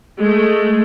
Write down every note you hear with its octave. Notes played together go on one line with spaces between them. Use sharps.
G#3 A3